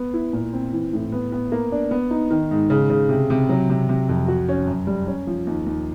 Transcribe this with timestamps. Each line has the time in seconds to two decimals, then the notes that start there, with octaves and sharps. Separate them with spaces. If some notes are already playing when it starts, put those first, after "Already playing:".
Already playing: B3
0.14 E4
0.33 A#2
0.53 C4
0.73 E3
0.93 A2
1.12 B3
1.32 B3
1.52 A#3
1.72 D4
1.91 B3
2.11 D#4
2.31 D#3
2.51 G#2
2.70 C#3
2.90 C#3
3.09 C3
3.30 C3
3.49 F#3
3.70 C3
3.89 C3
4.09 F2
4.28 F#4
4.49 C#4
4.67 F#2
4.87 G3
5.07 C#4
5.27 F3
5.47 D#2
5.66 D#2